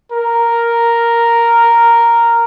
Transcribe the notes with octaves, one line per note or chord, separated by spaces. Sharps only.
A#4